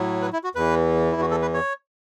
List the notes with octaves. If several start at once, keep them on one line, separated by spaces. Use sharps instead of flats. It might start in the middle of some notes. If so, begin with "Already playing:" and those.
Already playing: A2 F#3
B4
E4
F#4
E2 E3 B4
E4
F#4
A4
B4
C#5